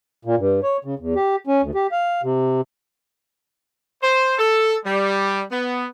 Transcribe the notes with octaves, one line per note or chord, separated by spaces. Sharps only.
A#2
G2
C#5
C#3
E2
G4
C#4
D2
G4
F5
C3
C5
A4
G3
B3